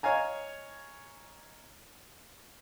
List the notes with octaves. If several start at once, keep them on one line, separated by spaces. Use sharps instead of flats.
C#5 D#5 F5 G#5 A#5